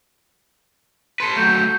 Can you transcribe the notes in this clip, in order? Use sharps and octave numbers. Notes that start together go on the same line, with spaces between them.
A4 B4 C6
F#3 A3 G6